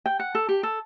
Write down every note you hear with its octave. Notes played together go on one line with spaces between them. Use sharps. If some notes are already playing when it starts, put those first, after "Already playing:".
G5
F#5
A4
G4
A4